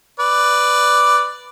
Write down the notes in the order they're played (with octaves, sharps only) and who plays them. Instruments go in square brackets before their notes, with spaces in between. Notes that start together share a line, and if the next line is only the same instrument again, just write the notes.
[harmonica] B4 D5